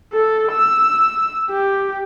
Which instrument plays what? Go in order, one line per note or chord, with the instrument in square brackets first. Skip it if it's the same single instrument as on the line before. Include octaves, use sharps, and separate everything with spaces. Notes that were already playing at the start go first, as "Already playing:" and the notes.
[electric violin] A4
E6
G4